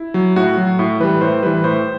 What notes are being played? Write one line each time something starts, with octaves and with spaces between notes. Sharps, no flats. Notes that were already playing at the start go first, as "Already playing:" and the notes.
Already playing: E4
F#3
A2 F#4
F#3
A2
E3 G3 B4
A2 C5
E3 G3 B4
A2 C5